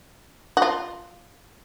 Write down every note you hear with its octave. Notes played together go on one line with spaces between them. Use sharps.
F#4
F4